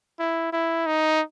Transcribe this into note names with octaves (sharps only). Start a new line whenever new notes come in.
E4
E4
D#4